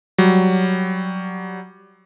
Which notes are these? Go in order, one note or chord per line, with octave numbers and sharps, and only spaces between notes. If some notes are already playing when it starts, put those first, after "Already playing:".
F#3 G3